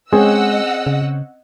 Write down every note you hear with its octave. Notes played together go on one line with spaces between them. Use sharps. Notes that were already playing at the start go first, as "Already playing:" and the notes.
G#3 C4 C#4 G#4 D#5 F#5 E6
C#3